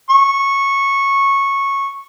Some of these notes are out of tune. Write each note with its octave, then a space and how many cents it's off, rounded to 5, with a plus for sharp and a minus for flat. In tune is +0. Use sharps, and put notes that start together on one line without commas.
C#6 -10